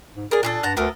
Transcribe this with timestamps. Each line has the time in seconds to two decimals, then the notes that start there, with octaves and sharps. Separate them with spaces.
0.16 G#2
0.31 G#4 A#4 D5
0.43 A#2 D4 G#4 A4
0.63 G2 F#5 A5 A#5
0.77 D2 B3 A4 A#4